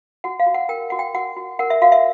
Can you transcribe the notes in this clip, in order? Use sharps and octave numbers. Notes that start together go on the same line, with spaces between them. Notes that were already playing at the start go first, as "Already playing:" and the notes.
F#4 F#5
F5
F#4
F#5
A#4 G5
F#4 F#5
G5
F#4 F#5
F#4
A#4 F#5
E5
F#4 F5
E5